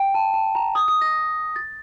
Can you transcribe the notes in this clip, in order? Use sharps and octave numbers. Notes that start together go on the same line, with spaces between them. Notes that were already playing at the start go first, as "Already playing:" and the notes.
Already playing: G5
A5
A5
A#5
D#6
D#6
A#6
A6